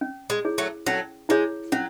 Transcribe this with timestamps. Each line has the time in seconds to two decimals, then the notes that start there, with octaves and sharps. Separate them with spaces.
0.01 C#4
0.30 G#3
0.45 E4 G#4 C#5
0.58 F#3 A3
0.86 F#3 A3 C#4
1.29 G#3 E4 G#4 C#5
1.72 F#3 C#4